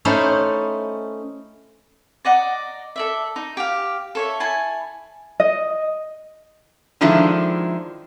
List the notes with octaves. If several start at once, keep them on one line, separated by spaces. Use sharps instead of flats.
A3 C#4 D#4 E4 C5
D5 D#5 F#5 A#5
A4 D5 E5
D#4
G4 F5
A4 C#5 E5
E4 G#5 A5
D#5
D3 D#3 F3 G#3 D4 E4